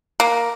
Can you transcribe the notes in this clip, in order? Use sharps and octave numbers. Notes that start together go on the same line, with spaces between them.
A#3